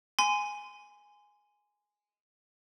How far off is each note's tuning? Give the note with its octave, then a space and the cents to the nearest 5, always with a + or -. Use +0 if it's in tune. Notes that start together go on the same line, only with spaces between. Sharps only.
G#5 +0 C6 -25